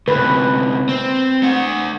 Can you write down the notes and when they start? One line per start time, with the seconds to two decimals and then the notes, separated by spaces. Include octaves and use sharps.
0.08 D2 C3 B4
0.89 C4
1.42 A3 F#5